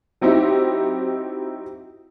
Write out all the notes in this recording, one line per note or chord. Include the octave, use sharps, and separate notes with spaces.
F#3 C4 D#4 E4 G4